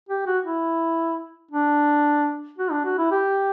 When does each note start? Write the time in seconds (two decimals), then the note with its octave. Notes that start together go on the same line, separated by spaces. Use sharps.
0.09 G4
0.27 F#4
0.45 E4
1.51 D4
2.58 F#4
2.71 D4
2.85 F#4
2.98 E4
3.11 G4